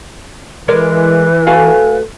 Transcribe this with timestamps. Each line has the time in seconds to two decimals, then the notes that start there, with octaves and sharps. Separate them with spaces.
0.68 E3 G#3 A#4 B4 D5
1.47 A3 F#4 F5 G#5